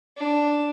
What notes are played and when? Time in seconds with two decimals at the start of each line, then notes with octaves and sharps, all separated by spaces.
0.17 D4